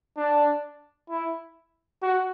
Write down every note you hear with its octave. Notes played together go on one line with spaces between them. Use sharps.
D4
E4
F#4